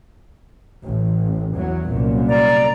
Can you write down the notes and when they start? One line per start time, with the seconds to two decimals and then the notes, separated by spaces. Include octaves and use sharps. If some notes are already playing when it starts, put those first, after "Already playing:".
0.83 A1
1.54 E2 F#3
1.88 C2 F#2 A#2
2.28 D5 A#5